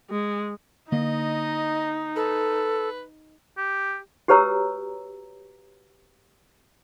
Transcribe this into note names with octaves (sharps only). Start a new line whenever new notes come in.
G#3
D3 A#3 D#4 D#5
A4 B4
G4
F#4 G4 B4 C#5 A#5 E6